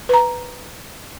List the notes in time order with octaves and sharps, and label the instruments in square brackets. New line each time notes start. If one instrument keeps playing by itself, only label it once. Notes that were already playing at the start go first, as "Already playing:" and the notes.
[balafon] B4 A#5